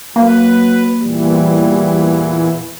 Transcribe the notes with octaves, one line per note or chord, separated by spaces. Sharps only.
F#3 A#3 B4
E2 A#2 E3 G3